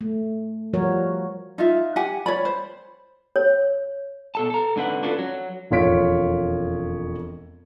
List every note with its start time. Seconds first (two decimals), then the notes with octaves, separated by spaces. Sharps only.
0.01 A3
0.73 F3 G3 F#4 A#4 C#5
1.58 D#4 F4 E5
1.96 G4 F#5 G#5
2.26 C#5 D5 B5
2.45 C5
3.36 C#5
4.35 B2 A4 A5
4.50 A4 A#5
4.76 G#2 D3 C4 B4 F#5
5.03 C#4 D4 F4 F#4 A4 B4
5.19 F#3
5.71 E1 F2 F4 C#5 B6 D7